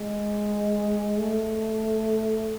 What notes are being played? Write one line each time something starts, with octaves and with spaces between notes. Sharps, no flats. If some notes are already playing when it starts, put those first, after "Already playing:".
Already playing: G#3
A3